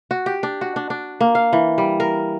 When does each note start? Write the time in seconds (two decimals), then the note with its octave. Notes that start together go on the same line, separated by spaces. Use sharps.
0.11 F#4
0.26 G4
0.43 D4
0.61 F#4
0.76 D4
0.90 D4
1.21 A#3
1.35 F5
1.53 E3
1.78 G3
2.00 A#4